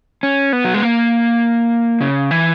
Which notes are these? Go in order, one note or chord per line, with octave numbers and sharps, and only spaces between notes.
C#4
B3
F#3
G#3
A#3
C#3
E3